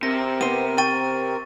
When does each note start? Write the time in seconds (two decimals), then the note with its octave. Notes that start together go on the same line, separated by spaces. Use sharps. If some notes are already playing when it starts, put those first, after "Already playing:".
0.03 C3 C4 A#4 A#6
0.41 B3 C5 D#7
0.78 G5 C#6 A6 D#7